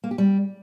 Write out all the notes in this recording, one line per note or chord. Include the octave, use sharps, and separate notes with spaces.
A#3
G4
G3